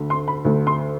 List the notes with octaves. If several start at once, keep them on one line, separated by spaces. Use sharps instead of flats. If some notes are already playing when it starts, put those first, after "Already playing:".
Already playing: D2 D3
C6
B5
D2 D3
C6